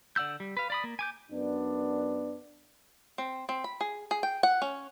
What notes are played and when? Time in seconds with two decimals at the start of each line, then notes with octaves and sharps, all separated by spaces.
0.16 D3 D5 F#5 E6 G6
0.40 G3
0.57 B4 F5
0.70 D5 B5 D#6
0.84 A#3
0.99 G#5 D6 G6
1.31 F#2 B3 D4
3.18 C4
3.49 C4
3.64 B5
3.81 G#4
4.11 G#4
4.23 G5
4.43 F#5
4.62 C#4